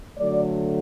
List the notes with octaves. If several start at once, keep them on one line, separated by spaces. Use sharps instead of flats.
D3 F#3 A3 D5